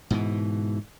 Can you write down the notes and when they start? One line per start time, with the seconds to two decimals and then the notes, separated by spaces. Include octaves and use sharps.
0.10 G#2 B2 E3